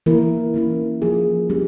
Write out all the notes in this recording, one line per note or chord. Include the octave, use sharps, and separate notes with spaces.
E3 A#3 E4 A#4
E3 A#3 C#4 E4
F3 A#3 C#4 F4 G#4
G3 C#4 G4